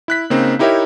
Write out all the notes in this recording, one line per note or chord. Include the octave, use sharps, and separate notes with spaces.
E4 F#6 B6
C#3 A#3 C4 D#4
D#4 E4 G4 A#4 C#5 E5